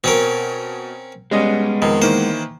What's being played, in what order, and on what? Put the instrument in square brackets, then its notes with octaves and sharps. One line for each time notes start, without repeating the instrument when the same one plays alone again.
[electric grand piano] B2 [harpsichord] C4 C#4 A#4
[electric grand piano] G3 C#4 D#5 [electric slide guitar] G#3 B3
[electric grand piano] F2 [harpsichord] D#3
[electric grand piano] D#3 E3 A#3 [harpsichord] C5